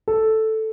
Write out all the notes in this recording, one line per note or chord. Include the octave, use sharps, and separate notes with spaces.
A4